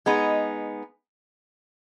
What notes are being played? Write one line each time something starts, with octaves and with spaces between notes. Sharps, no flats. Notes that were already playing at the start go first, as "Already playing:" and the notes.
G#3 B3 D#4